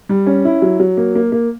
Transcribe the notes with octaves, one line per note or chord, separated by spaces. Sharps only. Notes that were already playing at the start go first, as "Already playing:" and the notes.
G3
C#4
E4
F#3
F#3
A#3
A#3
A#3